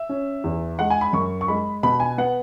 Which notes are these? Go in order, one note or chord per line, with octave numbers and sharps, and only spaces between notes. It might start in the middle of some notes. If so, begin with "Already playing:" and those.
Already playing: E5
C#4
E2
G#3 F#5
G#5
B5
F#2 C#6
C#6
G#3 B5
B2 B5
G#5
B3 F#5